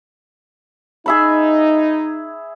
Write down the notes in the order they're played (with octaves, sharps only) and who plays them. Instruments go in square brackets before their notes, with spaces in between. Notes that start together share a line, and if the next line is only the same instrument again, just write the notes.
[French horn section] D#4 [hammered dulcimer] G#4 E5 B5